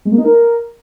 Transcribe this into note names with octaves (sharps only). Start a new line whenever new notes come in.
G#3
A#3
D#4
A#4